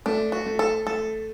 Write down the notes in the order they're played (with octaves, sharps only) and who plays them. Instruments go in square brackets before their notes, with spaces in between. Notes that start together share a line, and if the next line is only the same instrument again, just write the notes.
[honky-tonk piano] A3 [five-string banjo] D4
[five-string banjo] F#4
[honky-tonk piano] A3
[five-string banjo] A4
[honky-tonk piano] A3 [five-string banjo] A4